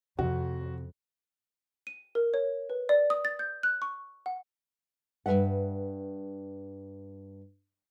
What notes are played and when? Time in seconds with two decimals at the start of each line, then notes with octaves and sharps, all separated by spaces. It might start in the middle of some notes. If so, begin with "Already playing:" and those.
0.19 F2 C3 F#4
1.87 D#7
2.15 A#4
2.34 C#5
2.70 B4
2.89 D5
3.10 D#6
3.25 A6
3.39 G6
3.63 F#6
3.82 C#6
4.26 F#5
5.26 G2 C#3 B4 E5 F#5